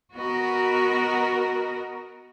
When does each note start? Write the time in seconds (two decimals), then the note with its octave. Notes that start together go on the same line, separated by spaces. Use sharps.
0.15 B3 F#4 A#4 D#5